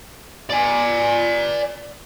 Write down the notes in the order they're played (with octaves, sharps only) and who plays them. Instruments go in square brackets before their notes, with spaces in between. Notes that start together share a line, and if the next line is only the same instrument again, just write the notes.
[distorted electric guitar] D5 G#5